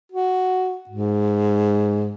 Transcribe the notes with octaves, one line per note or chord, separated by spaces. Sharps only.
F#4
G#2